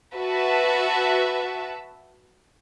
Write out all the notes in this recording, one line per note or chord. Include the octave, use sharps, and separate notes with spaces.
F#4 B4 E5 A5